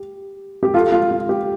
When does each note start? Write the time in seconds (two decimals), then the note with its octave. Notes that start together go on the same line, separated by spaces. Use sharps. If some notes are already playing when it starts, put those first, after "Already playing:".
Already playing: G4
0.63 G4
0.74 F4 A4
0.92 F4
1.11 F4
1.29 G4